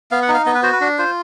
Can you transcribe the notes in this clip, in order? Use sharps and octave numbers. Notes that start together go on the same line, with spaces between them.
B3 F5
F#5
D#4
F5
B3 D#5
B4
F#4 C5
B4
D4
F4 C5